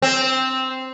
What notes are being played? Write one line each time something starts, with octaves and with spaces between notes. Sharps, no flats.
C4